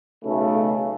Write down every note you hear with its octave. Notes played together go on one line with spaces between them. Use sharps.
B1 C#3 A3